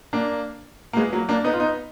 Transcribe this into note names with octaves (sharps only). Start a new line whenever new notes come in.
A#3 D4
A#3
G#3 B3
F#3 A#3
A#3 D4
B3 D#4
F4
B3 D#4